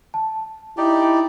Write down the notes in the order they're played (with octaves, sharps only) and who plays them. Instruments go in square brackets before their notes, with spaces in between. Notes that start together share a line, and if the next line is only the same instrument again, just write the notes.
[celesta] A5
[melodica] D#4 G4 D5 [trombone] E4